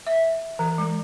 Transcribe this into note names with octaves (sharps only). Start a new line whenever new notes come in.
E5
E3
G#3